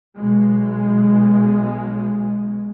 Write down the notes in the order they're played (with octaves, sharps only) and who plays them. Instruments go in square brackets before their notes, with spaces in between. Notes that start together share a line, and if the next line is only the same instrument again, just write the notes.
[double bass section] B1 B2 G#3